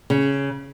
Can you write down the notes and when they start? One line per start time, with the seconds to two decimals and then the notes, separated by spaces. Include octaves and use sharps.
0.10 C#3